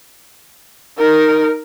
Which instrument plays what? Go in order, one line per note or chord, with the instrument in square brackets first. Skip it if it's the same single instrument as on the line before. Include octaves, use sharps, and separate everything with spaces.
[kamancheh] D#4 A#4